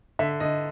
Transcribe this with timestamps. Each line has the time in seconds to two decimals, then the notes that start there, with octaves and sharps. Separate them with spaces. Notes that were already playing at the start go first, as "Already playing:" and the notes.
0.19 D3 E5
0.40 D3 D#5